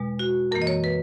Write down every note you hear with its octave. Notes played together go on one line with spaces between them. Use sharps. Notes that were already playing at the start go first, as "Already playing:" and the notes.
Already playing: E2 B2 G#3
F#4
F#2 E3 A#3 A#4
D#5
C#5
B4